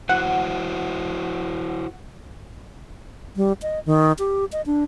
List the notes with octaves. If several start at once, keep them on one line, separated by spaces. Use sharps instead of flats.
E4 F#4 C5 F#5
G3
D#5
D#3
G4
D#5
D4